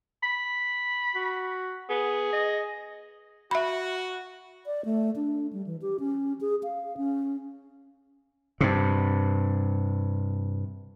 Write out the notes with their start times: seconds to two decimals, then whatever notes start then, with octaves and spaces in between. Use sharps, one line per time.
0.23 B5
1.15 F#4
1.90 B3 G#4
2.33 D#5
3.51 F#4 E5 B5
4.66 D5
4.85 A3
5.16 D4
5.53 G3
5.67 E3
5.82 G4
6.00 C#4
6.41 G#4
6.63 F5
6.97 C#4
8.61 G2 C3